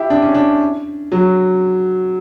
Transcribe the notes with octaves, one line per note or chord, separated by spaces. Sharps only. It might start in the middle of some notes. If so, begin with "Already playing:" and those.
Already playing: E4 G4
D4
C#4
D4
F#3